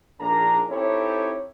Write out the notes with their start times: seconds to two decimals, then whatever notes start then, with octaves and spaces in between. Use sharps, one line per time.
0.18 A#1 A#3 D4 D#4 G#4 A#5
0.68 C4 D#4 E4 G4 A4 C#5